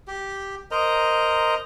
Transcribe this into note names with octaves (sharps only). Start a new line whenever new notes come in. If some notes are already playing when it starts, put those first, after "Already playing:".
G4
A#4 C5 D#5 A#5